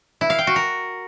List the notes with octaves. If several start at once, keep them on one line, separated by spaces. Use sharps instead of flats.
E4
F5
G5
F#4
A#4